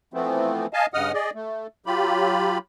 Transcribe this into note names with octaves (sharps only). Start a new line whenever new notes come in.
E3 F3 A3 B3 C4
D#5 F5 G#5 A5
G2 C#3 D#5 F#5 D#6 F6
G#4 D5 D#5
A3
F#3 F4 G4 B5